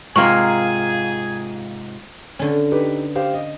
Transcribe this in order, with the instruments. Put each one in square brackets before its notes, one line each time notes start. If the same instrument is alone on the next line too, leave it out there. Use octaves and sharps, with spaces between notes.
[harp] G#2 F4 [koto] C3 A#3 [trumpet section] G#4 G#5 [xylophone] C#6
[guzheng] D3 C#4
[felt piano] D#4 G4 B4
G4 C5 F5
D#5